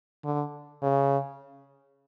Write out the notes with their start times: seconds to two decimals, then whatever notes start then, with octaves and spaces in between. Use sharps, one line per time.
0.25 D3
0.83 C#3